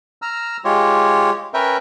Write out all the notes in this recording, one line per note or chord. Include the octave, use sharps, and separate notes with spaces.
A#5 E6 F6
G#3 F4 G4 C#5
C#4 A#4 B4 E5 G5